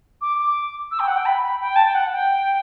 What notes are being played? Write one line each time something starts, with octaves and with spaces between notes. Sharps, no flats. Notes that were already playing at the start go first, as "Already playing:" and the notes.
D6
D6
E6
G5
F#5
G5
B5
B5
G5
A5
G5
F#5
G5